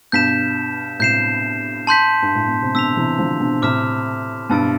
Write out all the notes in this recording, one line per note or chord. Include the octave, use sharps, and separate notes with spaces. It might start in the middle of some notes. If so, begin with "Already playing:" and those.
G2 B2 G6 B6 E7
A2 C3 G6 C7 E7
A5 C6 G6 B6
G2
A2
B2
C3
B2 D3 E6 B6 F7
C3 E3
D3 F3
B2 D3
A2 C3 D6 F6 B6 E7
G2 B2 A5 E6 A6 D7